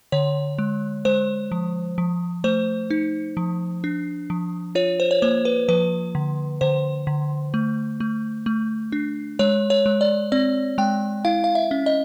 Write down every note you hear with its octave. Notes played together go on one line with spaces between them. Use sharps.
D3 C#5
G#3
G#3 C5
F3
F3
A3 C5
D#4
F3
D4
F3
F4 C#5
C5
C#5
A#3 C5
B4
F3 B4
D3
D3 C5
D3
A3
A3
A3
D4
G#3 C#5
C#5
G#3
D5
C4 D5
G#3 G5
E4 F5
F5
E5
C#4
D#5